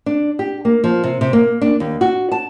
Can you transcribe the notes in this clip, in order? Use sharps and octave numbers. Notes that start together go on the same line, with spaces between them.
D4
G4
A#3
F3
C3
C3
A#3
D4
D#2
F#4
A5